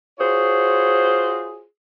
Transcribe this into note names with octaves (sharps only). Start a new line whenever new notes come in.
F4 F#4 G#4 C5 C#5